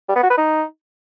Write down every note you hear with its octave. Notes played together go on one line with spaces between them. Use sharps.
G3
B3
F#4
B4
D#4